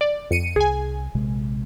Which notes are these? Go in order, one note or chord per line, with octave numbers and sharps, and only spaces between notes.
D5
F2 C#7 D#7
C2 G#4 G#5
A#1 C3 G#3